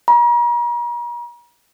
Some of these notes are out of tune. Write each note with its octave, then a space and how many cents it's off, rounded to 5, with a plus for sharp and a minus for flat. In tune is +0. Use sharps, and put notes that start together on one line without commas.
A#5 +40